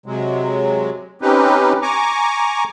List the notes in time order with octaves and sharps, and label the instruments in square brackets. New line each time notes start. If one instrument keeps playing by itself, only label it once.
[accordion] C3 F#3 G#3
C4 C#4 D#4 G4 B4
G#5 A#5 C#6 D6